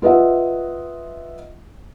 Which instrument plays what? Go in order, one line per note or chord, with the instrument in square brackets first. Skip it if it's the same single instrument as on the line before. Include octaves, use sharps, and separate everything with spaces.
[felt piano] F4 B4 D#5 E5 F#5